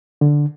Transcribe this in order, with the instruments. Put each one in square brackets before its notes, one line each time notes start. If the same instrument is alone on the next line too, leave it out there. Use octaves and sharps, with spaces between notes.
[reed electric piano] D3